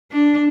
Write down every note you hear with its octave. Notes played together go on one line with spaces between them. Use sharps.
D4